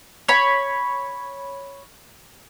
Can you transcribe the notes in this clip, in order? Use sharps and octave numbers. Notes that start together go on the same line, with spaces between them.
C#5 B5